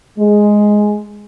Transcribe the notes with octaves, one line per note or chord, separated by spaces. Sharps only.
G#3